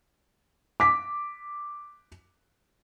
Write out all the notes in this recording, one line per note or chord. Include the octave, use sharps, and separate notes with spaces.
D6 B6